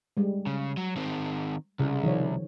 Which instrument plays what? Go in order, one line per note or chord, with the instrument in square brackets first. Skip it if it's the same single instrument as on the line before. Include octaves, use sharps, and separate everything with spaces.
[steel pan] G3 G#3
[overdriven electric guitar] C#3
F#3
D#3 C4
[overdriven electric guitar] C2 [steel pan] C#3
[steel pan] D#3 F3 C#5